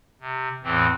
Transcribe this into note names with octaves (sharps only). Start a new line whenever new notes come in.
C3
E2 A2 E3 C4